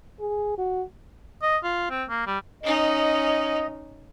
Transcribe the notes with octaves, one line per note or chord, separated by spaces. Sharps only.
G#4
F#4
D#5
F4
C4
A#3
G3
C#4 D#4 D#5